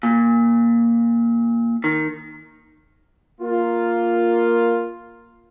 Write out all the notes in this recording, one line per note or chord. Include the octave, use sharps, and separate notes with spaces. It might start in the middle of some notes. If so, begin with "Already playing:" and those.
A#2
D#3
A#3 F4